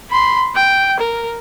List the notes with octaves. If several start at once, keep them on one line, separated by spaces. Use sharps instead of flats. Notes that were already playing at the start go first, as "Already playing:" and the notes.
B5 C6
G5
A#4